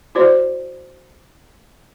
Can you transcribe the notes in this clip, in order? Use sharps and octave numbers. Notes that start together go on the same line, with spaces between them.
E4 F#4 C5 D5